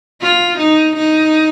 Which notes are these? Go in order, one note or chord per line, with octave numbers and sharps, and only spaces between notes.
F4
D#4
D#4